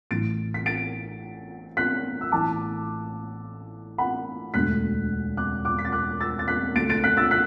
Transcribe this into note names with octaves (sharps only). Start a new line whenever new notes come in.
A1 A2 E3 A6 D7
B6
A6 D7
F#6 B6
E6
A1 A2 E3 A5 D6
F#5 B5
E1 D2 D3 F#6 B6
D6 F#6
D6 F#6
B6
A6
D6 F#6
E6 A6
A6
F#6 B6
D2 D3 A6 D7
A6 D7
F#6 B6
E6 A6
F#6 B6